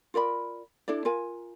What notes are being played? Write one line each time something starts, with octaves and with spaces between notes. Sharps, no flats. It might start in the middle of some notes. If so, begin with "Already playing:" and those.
F4 A#4 D5 B5
D4 E4 A4 D5
F4 A#4 G#5